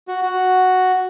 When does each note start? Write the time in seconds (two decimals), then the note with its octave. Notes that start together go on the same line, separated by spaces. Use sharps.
0.08 F#4
0.22 F#4